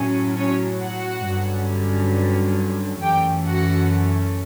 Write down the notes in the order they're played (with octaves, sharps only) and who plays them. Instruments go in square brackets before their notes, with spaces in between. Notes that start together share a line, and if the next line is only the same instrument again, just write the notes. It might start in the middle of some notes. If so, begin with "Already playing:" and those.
Already playing: [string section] A2 F#3 C#4
C#4 C#5
F#4 F#5
G1 G2 D3 F#3 C#4
F#2 E3 A3 C#4 G4 G5
F#4 F#5